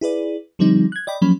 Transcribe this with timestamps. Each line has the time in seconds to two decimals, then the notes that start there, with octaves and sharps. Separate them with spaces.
0.01 E4 G#4 B4 D5
0.59 D3 F3 G3 C4 D#4
0.92 F#6 G#6
1.07 D5 D#5 G5 B5
1.22 F3 F#3 A#3 C#4 B5